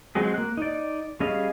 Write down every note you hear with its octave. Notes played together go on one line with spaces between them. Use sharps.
F#3 G#3 C4 F#4 G#4
A#3 F#6
D#4 D5
G3 C#4 G#4 D#5 F5